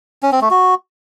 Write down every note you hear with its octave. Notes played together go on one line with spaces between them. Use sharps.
C#4
C4
A3
F#4